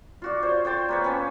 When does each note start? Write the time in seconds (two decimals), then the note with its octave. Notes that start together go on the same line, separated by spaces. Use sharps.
0.22 F4 F#4 D5
0.43 C5 C#5
0.65 C5 G5 A5 C6
0.89 A#3 B4 C#5
1.04 B3 C#4 C5